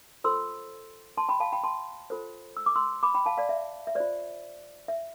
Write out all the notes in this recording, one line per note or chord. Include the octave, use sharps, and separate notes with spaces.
F4 A4 C5 C6 E6
A5 C6
G5 B5
F5 A5
G5 B5
A5 C6
F4 A4 C5
E6
D6
C6 E6
B5 D6
G5 B5
F5 A5
D5 F5
E5
E5
F4 C5 D5
E5